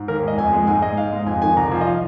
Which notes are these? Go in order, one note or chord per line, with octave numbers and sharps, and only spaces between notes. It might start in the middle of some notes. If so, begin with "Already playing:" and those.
Already playing: G#2
D#2 A#4
G#3 D#5
F2 G#5
G#3
G#2 G#5
G#3 D#5
G#2 F5
G#3
F2 G#5
D#3 G#5
C2 A#5
F3 G#5
D#5
F5